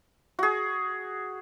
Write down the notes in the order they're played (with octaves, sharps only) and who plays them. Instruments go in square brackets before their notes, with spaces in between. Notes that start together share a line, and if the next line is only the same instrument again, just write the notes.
[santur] F#4 G#4